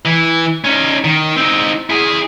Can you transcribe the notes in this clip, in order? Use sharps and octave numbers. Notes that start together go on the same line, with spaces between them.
E3
C#4 D#4
D#3
C4 D#4
E4 G#4